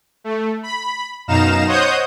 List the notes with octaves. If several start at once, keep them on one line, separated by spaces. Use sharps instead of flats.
A3
B5
F#2 B2 D#4 F5 A#5 E7
C5 C#5 D#5 F#5 D#6 G6